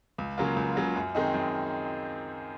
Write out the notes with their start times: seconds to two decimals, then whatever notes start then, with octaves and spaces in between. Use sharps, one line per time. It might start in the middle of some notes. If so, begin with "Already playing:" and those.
0.18 C#2
0.38 C#3 F#3 A#3 F4
0.56 C#2
0.76 C#3 F#3 A#3 F4
0.96 F#2
1.15 D#3 G#3 C4 D#4
1.34 F#2